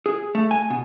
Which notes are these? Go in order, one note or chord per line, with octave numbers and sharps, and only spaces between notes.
G#4
A3
G#5
B2